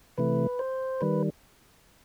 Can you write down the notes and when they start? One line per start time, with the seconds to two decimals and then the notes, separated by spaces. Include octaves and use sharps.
0.18 C3 E3 A3 B4
0.59 C5
1.01 D#3 G3 B4